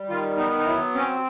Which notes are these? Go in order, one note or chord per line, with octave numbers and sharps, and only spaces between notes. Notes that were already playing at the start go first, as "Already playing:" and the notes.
Already playing: G3
D#3 F4
B3 D#4
D#4
F#3 E4
C4 C#4